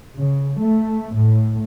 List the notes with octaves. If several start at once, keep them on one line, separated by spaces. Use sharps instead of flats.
C#3
A3
A2